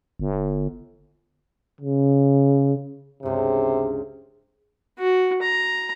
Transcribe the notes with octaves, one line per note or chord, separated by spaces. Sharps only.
G1
C#3
C#2 G2 C3
F#4
A#5